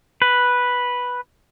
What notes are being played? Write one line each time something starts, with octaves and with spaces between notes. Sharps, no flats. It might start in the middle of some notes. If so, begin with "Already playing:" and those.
B4